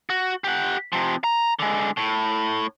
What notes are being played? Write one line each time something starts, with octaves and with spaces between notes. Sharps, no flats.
F#4
G4 F#5
C3 F3
A#5
D3 G#3
A2